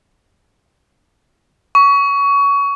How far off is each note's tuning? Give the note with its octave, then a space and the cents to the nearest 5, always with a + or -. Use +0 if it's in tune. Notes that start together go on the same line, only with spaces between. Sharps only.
C#6 +25